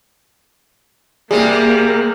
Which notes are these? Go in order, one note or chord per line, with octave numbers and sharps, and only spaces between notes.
C3 G3 A#3 G#4